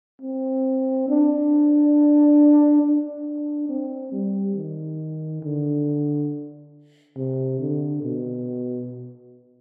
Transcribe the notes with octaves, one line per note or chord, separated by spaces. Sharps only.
C4
D4
D4
C4
G3
D#3
D3
C3
D3
B2